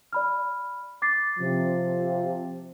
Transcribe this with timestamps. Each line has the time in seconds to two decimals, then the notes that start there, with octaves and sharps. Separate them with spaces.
0.13 D5 B5 F6
1.02 D6 A6 C7
1.39 C3 F3